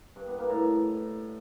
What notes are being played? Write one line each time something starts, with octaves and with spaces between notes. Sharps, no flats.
G2
B3
A#3
A2